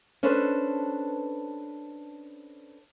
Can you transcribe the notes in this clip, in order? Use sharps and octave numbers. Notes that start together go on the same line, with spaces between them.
C#4 D4 A4 B4 C5